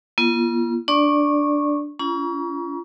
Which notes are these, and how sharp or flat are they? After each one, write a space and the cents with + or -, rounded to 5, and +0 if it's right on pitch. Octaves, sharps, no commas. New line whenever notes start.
A#3 +45 F4 -35
D4 +0 D5 +0 C#6 -15
C#4 +35 F4 -35 A#5 +35